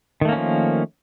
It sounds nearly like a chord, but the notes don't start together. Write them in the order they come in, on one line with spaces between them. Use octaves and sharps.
D#3 A3 A#3 C#4 F3